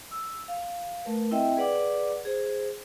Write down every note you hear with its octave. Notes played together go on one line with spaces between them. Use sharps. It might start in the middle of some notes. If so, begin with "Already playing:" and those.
E6
F5
A3 A#4 B4
C4 E4 D#5 E5 G5
G#4 B4 D5 F#5 D6
G#4 C5